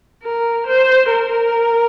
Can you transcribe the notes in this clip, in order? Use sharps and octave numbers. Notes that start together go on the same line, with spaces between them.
A#4
C5
A#4